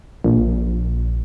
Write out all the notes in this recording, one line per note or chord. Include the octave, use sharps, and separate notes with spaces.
A#1